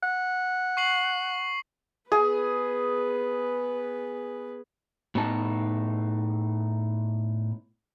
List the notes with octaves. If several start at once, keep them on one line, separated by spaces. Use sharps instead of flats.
F#5
C#6 C7 F#7
B3 G#4 B4
A2 B3 D#4 A5